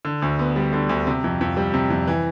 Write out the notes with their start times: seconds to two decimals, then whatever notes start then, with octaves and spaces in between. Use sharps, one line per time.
0.05 D3
0.22 D2
0.39 B3
0.56 G3
0.73 D3
0.89 D2
1.07 C3
1.24 F2
1.41 F2
1.57 G3
1.74 C3
1.90 F2
2.07 E3